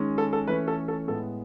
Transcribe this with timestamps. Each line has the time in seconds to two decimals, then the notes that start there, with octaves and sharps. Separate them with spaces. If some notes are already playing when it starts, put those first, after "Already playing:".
Already playing: D#3 G#3 C#4
0.18 A4
0.33 A4
0.48 E3 A3 C#4 B4
0.68 A4
0.88 A4
1.08 A2 G#3 B3 A4